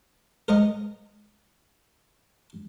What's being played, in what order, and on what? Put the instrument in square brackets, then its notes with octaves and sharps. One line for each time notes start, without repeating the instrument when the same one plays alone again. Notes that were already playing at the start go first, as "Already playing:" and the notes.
[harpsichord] A#4 C5 D#5 F#5 A#5